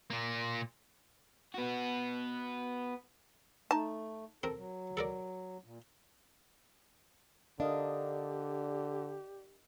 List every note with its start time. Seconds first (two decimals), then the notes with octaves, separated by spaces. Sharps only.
0.10 A#2 A#3
1.54 B3 F#4
3.71 A3 D#4 A5
4.43 C4 A4 A#4
4.56 F#3
4.97 A4 A#4 D5
5.64 A#2
7.60 D3 D4 G4 A#4 D#5 F5